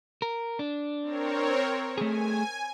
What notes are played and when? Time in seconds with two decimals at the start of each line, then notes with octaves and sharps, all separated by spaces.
0.22 A#4
0.59 D4
1.02 C4 A#4 C#5
1.98 A3 G#4 G#5